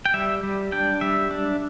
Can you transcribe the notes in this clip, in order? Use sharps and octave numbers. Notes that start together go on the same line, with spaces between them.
G5
G3 E5
G3
D4 G5
G3 E5
D4